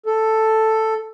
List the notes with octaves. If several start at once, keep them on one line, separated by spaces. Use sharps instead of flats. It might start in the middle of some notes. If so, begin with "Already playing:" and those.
A4